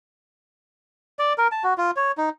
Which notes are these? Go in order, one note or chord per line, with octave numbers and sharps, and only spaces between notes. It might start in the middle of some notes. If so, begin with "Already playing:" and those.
D5
A#4
A5
F#4
F4
C#5
D#4